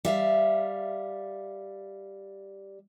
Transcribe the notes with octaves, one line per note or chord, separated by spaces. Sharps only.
G3 E5 F5